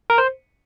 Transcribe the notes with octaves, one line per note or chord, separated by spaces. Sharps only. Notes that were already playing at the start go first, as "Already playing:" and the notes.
A#4
C5